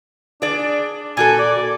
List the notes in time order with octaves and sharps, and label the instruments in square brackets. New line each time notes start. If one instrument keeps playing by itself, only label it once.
[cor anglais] D4 [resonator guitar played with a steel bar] G#4 D5
[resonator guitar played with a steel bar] A#2 F#4 A4 [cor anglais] G#5
[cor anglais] D5